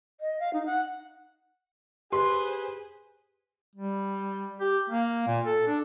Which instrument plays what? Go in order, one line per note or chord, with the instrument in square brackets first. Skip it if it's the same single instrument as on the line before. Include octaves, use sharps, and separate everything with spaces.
[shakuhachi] D#5
F5
D#4
F#5
[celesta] G4 [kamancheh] G#4 C5 [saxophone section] B4 [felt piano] C6
[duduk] G3
G4
A#3
A#2
A4
D4